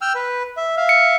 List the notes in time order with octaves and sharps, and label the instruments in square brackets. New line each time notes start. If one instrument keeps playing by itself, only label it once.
[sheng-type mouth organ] G5 E6 F6
B4
E5
E5 F5
[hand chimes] C#7